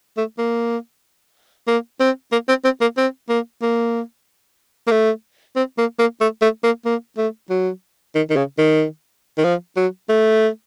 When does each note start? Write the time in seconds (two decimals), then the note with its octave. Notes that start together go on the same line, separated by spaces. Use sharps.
0.17 A3
0.38 A#3
1.68 A#3
2.00 C4
2.32 A#3
2.48 C4
2.65 C4
2.81 A#3
2.97 C4
3.29 A#3
3.62 A#3
4.87 A#3
4.91 A3
5.56 C4
5.78 A#3
5.99 A#3
6.21 A3
6.42 A3
6.64 A#3
6.85 A#3
7.18 A3
7.50 F#3
8.15 D#3
8.30 D#3
8.36 C#3
8.58 D#3
9.38 D#3
9.44 F3
9.77 F#3
10.09 A3